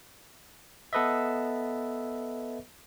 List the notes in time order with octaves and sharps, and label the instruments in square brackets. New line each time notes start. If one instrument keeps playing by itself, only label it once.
[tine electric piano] B3 A4 B4 D#5 E5